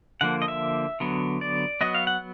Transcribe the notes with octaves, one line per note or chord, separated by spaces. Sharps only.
D3 F3 A#3 F#5
D#5
E5
D3 F#3 B3
D5
F#3 B3 D#5
F5
F#5